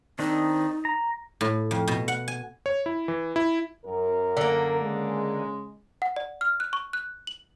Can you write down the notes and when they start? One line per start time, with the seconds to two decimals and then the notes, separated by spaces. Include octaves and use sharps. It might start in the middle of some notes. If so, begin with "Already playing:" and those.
0.19 D#3 C4 D4 D#4
0.85 A#5
1.41 A2
1.71 F2
1.88 B2
2.08 F#5
2.28 G#5
2.66 C#5
2.86 E4
3.08 E3
3.36 E4
3.85 F#2 A#4
4.37 D3 A#3
4.81 C#3 G#3
6.02 F#5
6.16 D5
6.41 F6
6.60 F#6
6.73 C#6
6.93 F#6
7.27 F#7